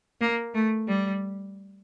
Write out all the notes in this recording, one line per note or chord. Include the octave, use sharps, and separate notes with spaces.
A#3
A3
G3